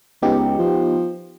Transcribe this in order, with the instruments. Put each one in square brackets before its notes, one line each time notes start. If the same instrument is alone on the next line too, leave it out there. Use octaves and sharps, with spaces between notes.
[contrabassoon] C#2 [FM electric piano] B3 D#4 G4
[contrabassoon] F3